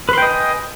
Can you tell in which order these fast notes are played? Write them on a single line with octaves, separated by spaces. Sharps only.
B4 C6 G5 D#5 G#5